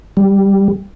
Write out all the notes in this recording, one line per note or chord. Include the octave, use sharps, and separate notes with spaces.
G3